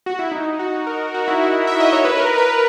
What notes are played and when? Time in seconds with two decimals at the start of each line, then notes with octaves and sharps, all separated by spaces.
0.06 F#4
0.19 E4
0.32 D#4
0.59 F#4
0.87 A#4
1.14 F#4
1.28 E4
1.42 F#4
1.67 E5
1.80 D#5
1.92 C#5
2.05 B4
2.17 A#4
2.38 B4